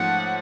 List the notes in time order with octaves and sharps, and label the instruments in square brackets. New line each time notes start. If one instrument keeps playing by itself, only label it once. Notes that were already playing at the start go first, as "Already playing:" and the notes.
Already playing: [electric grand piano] G#2 F3 A3 C#4 [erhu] F#5